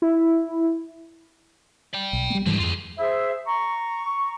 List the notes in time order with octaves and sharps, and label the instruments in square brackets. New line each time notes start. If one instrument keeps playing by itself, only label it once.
[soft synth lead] E4
[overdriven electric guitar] D5 G5
[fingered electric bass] B1
G3 A#3
[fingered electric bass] G#2 E3 G3 [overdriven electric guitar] D3 G4
[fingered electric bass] F2 [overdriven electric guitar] F4 G#4
[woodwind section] G#4 C5 E5
A#5 C#6